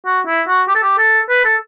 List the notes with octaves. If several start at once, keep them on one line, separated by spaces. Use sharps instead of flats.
F#4
E4
F#4
G4
A4
G4
A4
B4
A4